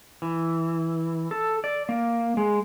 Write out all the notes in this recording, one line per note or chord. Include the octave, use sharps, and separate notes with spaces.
E3
A4
D5
A#3
G#3